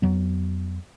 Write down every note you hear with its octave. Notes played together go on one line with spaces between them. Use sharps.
F2 F#3 B3